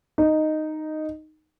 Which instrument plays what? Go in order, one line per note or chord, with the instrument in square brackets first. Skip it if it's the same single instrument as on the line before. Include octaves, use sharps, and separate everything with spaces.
[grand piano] D#4